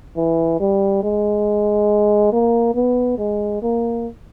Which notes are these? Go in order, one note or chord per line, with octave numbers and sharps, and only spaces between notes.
E3
G3
G#3
A#3
B3
G#3
A#3